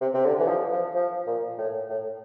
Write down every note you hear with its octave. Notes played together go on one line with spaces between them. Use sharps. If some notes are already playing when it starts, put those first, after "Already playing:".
C3
C3
D3
E3
F3
F3
F3
A#2
A2
A2